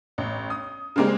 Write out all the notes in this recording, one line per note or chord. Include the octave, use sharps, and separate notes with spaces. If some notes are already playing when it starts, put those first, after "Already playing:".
A1
D#6
C#3 G3 G#3 A#3 C4